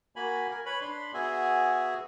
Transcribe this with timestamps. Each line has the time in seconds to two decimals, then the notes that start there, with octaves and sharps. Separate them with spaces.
0.16 A#3 F#4 G#5 B5
0.51 A#4 G#5
0.66 B4 C#5 B5
0.81 D4 B5 C6
1.14 B3 F#4 G#4 E5 G#5